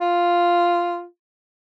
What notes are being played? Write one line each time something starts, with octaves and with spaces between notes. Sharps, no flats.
F4